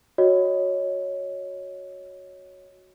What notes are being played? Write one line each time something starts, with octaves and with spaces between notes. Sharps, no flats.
F#4 C#5 D#5